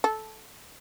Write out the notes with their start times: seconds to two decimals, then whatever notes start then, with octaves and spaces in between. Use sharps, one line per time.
0.04 A4